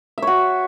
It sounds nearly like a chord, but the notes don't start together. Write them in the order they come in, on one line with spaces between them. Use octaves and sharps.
E5 C#5 F#4